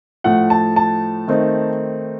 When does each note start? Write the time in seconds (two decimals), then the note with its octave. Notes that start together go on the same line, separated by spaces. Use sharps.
0.24 A2 F3 A3 F#5
0.50 A5
0.76 A5
1.28 D#3 A3 C4 D#4